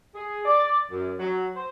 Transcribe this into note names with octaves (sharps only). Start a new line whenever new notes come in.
G#4
D5
F#2
F#3
C5